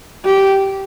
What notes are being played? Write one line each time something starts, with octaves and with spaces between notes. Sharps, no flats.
G4